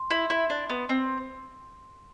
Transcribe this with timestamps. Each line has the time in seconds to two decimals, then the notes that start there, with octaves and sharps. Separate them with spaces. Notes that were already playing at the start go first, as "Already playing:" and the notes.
Already playing: C6
0.11 E4
0.30 E4
0.50 D4
0.69 B3
0.89 C4